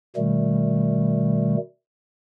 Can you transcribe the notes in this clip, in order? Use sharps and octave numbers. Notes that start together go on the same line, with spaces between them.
B2 D#3 G3 A3